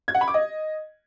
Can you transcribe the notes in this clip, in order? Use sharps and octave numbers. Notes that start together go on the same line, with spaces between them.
G#6
F#5
B5
D6
D#5